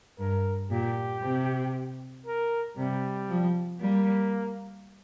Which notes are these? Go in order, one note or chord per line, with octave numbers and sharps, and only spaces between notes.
G2 A#4
A#2 G4
C3
A#4
C3 G3
F3
G3 A#3